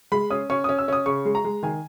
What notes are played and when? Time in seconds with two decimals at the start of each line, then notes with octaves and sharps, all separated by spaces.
0.12 G#3 B5
0.30 C#4 D#6
0.50 C#4 C#6
0.64 C#4 D#6
0.79 E6
0.88 C#4 D#6
1.06 C#3 C#6
1.25 G#3
1.35 A#5
1.45 G#3
1.63 D#3 G#5